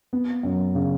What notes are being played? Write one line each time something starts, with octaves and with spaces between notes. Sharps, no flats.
B3
F#2
C#3